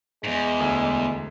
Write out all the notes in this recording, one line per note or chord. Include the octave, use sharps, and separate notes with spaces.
E2 G#2 G#3
E1 D2